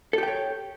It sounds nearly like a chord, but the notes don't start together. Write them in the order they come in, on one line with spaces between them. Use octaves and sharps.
A4 G4 G5 C#5